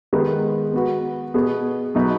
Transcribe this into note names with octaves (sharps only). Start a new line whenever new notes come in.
D#3 G#3 B3 D#4 B4
B3 F#4 B4
B2 B3 G#4
B2 F#3 B3 D#4 B4